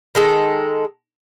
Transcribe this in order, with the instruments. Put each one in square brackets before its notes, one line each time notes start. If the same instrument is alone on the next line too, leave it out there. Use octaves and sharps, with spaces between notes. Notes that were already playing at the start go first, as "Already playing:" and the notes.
[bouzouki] D#3 G#3 A4